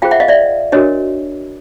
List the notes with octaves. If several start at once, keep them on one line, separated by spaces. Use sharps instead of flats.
F4 G#4 C5 F5 G5
E5 F#5
D#5 F5
D5 E5
D4 F#4 A#4 C#5 D#5